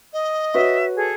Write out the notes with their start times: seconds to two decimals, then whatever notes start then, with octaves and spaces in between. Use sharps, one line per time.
0.12 D#5
0.54 F#4 B4 C#5 E5
0.96 G#4 A4